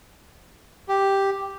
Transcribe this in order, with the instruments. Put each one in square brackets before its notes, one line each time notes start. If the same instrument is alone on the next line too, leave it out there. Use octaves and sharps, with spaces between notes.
[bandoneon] G4